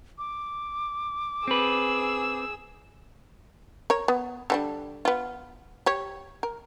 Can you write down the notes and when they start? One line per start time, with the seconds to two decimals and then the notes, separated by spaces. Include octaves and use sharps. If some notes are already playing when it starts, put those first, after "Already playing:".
0.18 D6
1.48 C4 G#4 B4 E6
3.90 A#4 C#5
4.08 B3
4.50 D3 G3 D4
5.05 B3 F4
5.86 G4 C#5
6.43 A#4